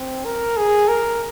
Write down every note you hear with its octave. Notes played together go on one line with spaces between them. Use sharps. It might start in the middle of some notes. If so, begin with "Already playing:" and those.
Already playing: C4
A#4
G#4
A#4